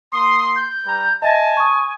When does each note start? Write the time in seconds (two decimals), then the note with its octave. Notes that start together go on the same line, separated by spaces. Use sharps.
0.12 A#3 C6 D#6
0.56 G6
0.85 G3 B4 A#5
1.22 D#5 E5 G#5 A5 A#6
1.57 C#6 D#6